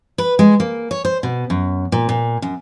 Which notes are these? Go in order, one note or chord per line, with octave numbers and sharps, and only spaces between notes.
B4
G#3
A#3
C#5
C5
B2
F#2
A#2
A#2
F#2